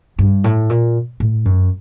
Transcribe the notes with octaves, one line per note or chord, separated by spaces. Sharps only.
G2
A2
A#2
A2
F#2